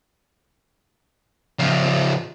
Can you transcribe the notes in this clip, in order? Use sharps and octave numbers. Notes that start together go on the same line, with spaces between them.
C#3 F3